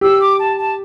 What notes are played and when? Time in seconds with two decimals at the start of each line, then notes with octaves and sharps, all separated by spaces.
0.01 G4 E6
0.21 D6
0.39 A5
0.58 A5